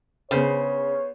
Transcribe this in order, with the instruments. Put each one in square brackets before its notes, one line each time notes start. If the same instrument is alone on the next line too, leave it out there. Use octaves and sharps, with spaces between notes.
[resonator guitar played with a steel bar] C#3 [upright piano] B3 G#4 C5 [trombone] C#5